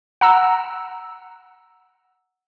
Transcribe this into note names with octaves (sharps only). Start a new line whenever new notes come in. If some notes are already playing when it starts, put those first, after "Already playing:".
F#5 A#5 E6